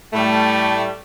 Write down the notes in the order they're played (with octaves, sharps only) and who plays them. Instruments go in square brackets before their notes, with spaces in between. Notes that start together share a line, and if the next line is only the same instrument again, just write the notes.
[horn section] A2 G3 A3